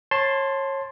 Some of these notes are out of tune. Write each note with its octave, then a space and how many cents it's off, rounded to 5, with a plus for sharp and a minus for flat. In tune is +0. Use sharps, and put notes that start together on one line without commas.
C#5 -30 A5 +0 C6 +0